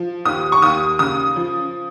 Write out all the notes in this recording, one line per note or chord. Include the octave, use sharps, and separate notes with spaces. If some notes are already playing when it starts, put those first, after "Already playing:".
Already playing: F3
D#2 D#6
C#6
D#2 D#6
C#3 D#6
F3